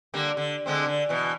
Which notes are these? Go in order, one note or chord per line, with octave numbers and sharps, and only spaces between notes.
D3 G3 A#3
D3
D3 G#3 C4
D3
B2 E3